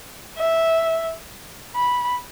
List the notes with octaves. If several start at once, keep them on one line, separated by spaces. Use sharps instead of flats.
E5
B5